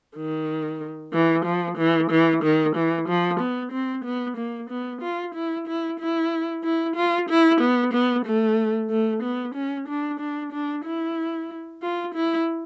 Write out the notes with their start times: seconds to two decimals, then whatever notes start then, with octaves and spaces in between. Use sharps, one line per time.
0.16 D#3
1.13 E3
1.45 F3
1.78 E3
2.11 E3
2.44 D#3
2.76 E3
3.08 F3
3.40 B3
3.72 C4
4.04 B3
4.37 A#3
4.70 B3
5.02 F4
5.35 E4
5.67 E4
6.00 E4
6.64 E4
6.96 F4
7.29 E4
7.61 B3
7.93 B3
8.25 A3
8.90 A3
9.23 B3
9.55 C#4
9.88 D4
10.20 D4
10.52 D4
10.84 E4
11.82 F4
12.15 E4